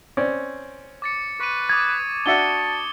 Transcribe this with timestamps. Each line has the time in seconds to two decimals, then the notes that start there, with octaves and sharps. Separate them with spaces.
0.17 C4 C#4 D5
1.02 D6 A6 C#7
1.40 B4 C#6 D#7
1.69 D6 D#6 G#6 A6
2.26 D4 F#4 E5 A5 C#7 G7